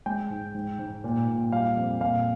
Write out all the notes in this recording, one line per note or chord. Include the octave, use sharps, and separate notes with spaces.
G#3 G5
G#2
G#2
G#2
A#2
A#2
G3 F5
F2
A#2 F5